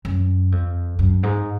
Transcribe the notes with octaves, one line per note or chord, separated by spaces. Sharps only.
F#2
F2
F#2
G#2